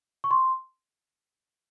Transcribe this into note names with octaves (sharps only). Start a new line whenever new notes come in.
C#6
C6